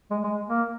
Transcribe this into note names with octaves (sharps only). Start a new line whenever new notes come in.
G#3
G#3
A#3